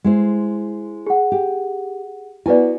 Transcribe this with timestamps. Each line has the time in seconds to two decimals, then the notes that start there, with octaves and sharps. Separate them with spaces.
0.04 G#3 E4 C5
1.07 G#4 F#5
1.32 G4
2.46 B3 E4 F#4 B4 D5 G#5